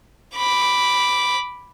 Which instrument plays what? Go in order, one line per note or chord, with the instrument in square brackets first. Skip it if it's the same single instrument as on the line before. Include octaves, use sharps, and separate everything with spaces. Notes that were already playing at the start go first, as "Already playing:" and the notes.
[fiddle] B5 D6